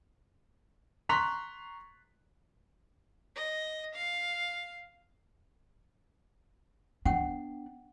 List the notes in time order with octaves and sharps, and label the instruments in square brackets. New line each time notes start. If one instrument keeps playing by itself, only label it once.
[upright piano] A#5 C6 C#6 F#6 B6 F7
[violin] D#5
F5
[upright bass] B3 D4 [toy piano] F#5 G5